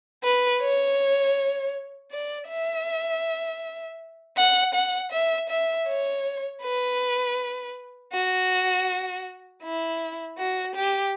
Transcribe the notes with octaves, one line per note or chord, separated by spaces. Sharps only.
B4
C#5
D5
E5
F#5
F#5
E5
E5
C#5
B4
F#4
E4
F#4
G4